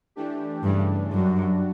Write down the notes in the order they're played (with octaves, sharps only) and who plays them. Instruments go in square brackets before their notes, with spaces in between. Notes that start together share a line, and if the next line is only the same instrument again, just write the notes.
[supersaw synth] E3 A3 D4 G4
[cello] G2 [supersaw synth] C#3 E3 A3 D4
[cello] F#2 [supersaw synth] G3 D4 F#4